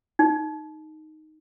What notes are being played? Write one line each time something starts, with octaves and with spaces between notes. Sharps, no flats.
D#4